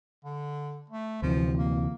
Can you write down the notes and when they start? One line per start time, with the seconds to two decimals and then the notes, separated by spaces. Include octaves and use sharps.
0.25 D3
0.90 A3
1.22 D2 C3 E3 F3
1.58 A#3